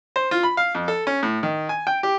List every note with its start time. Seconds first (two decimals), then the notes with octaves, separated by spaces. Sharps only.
0.16 C5
0.31 F4
0.43 B5
0.57 F5
0.75 F2
0.88 A4
1.07 C#4
1.23 A2
1.43 D#3
1.69 G#5
1.87 G5
2.03 G4